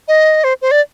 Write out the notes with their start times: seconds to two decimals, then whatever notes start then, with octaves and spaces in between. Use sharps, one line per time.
0.08 D#5
0.44 C5
0.62 C5
0.71 D5